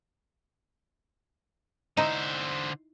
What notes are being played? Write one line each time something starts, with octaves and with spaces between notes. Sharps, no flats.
D3 D#4 E4 C5